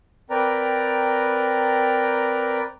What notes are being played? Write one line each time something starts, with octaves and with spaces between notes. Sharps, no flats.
C4 A#4 B4 D5 G5 A#5